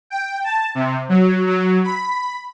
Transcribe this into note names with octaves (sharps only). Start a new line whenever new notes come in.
G5
A5
C3
F#3
F#3
B5